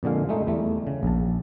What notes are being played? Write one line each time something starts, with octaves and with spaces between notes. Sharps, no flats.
F2 A#2 D3 G#3 F5
G#3 A3 D#4
E2 G3 A3
C#3
A#1 A5